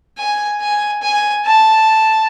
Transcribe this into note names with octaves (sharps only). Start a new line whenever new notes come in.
G#5
G#5
G#5
A5